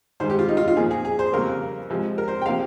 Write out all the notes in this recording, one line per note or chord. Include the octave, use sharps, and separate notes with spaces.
G2 D#3 G#3 C5
G4
F4
D#4
F4
F4
A#2 F3 A#3 G#4
G#4
G#4
C5
F2 C#3 G3 A#3 A#4
C3 F3 G#3
A#4
C5
G5
C3 F3 A#3 F5